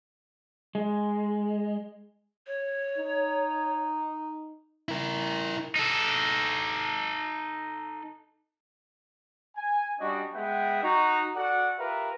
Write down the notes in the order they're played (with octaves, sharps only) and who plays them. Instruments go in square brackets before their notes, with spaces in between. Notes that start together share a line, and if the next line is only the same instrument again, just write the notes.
[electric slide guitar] G#3
[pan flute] C#5
[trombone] D#4
[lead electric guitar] E4 A#4
[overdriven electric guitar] D#4 A4
[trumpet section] G#5
G3 C#4 D4 F#4 D#5
G#3 B3 E5 F#5 G5
D#4 F#4 A#5
F#4 A4 D5 F#5
F4 G4 A#4 B4 E5 F5